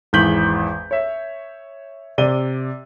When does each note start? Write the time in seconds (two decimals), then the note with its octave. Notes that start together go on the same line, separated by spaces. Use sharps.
0.13 G#1 E2 G6 B6 F#7
0.91 C#5 E5
2.18 C3 D5 D#7 G7